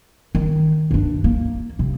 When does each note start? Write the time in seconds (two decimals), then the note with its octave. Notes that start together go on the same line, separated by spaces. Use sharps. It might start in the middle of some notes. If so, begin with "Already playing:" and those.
0.35 D#3
0.91 G2 D4
1.24 A#3
1.79 C3